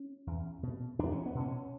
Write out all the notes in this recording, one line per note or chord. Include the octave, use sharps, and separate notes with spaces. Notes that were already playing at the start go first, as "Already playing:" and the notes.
Already playing: C#4
E2
B2
E2 D4
C#4
B3
B2
C#4